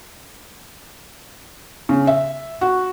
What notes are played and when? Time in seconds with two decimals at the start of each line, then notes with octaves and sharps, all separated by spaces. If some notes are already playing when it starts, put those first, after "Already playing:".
1.89 C#3
2.07 E5
2.61 F#4